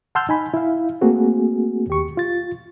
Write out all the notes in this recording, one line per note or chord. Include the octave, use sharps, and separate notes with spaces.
F#5 A5 C6 E6 F6 G6
D#4 G#5 B5
E4 F5
A3 A#3 C4 F#4 G#4
D#2 G4 C#6
F4 A6